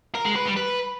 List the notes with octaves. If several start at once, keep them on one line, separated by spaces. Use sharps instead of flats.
A#4
G#3
B4
G3
B4